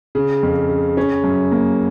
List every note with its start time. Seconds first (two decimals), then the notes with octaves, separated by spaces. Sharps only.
0.15 C#3
0.43 F2
0.69 C#3
0.97 C#4
1.24 F#2
1.52 A#3